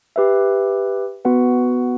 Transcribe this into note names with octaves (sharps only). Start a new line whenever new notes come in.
G4 B4 E5
B3 F#4 B4 F#5